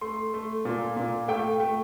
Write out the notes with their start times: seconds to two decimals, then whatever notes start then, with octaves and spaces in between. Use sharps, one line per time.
0.01 A3 C6
0.34 A3
0.65 A#2
0.97 A#2
1.28 A3 G5
1.60 A3